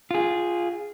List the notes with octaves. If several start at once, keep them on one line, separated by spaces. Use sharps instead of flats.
F4 G#4